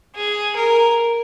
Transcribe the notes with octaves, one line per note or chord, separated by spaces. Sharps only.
G#4
A#4